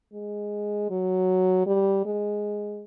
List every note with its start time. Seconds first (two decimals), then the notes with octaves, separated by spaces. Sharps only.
0.14 G#3
0.91 F#3
1.67 G3
2.06 G#3